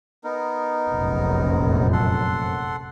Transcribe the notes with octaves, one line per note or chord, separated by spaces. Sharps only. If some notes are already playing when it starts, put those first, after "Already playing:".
B3 D#4 A#4
F1 A#1 F#2
A4 F#5 C6